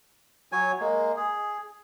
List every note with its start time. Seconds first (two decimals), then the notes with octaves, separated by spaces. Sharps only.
0.52 F#3 C#5 G#5
0.80 G#3 A#3
1.16 G#4